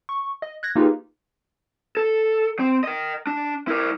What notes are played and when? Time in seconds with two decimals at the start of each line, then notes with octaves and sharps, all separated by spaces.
0.09 C#6
0.42 D#5
0.63 F#6 G#6 A#6
0.76 A#3 D#4 F4 G4 G#4 B4
1.97 A4
2.59 C4
2.84 A#4 D#5
3.27 D4
3.68 E4 A#4